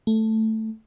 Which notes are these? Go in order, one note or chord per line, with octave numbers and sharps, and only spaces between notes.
A3